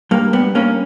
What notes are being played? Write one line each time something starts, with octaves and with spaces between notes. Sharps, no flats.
G2 A#3
G2 B3
G2 A#3 C#4